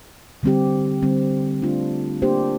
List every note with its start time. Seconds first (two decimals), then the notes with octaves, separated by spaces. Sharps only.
0.43 D3 G3 C4 G4
1.02 D3 G3 C4
1.62 D3 A3 D4 F4
2.22 A#3 D4 G4 C5